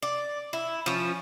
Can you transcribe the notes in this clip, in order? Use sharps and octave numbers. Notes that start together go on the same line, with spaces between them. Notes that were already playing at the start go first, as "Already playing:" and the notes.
D5
E4
F3 C#4